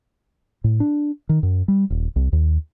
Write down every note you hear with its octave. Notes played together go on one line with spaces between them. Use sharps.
A2
D4
D#3
F#2
G3
D#1
C2
D#2